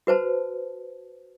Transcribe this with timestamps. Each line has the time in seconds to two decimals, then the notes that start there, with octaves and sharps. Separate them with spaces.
0.07 F#4 B4 C5 A5